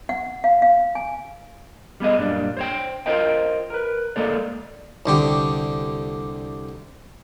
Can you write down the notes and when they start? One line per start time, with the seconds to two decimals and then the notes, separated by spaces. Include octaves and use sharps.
0.09 F#5
0.44 F5
0.62 F5
0.95 G#5
2.00 G3 B3 G#4 D#5
2.18 F#2 A#2 G3 D4
2.57 C5 C#5 G5
3.06 F4 A#4 C5 D#5 G5
3.70 A#4 B4
4.16 G#3 A#3 A4 C#5 D5
5.06 C2 D3 G4